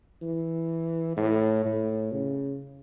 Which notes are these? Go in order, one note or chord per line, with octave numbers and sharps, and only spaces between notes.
E3
A2
A2
C#3